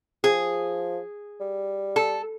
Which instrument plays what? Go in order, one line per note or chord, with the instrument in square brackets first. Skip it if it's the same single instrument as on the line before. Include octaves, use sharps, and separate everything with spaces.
[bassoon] F3 [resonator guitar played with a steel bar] G#4
[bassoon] G3
[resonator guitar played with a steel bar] A4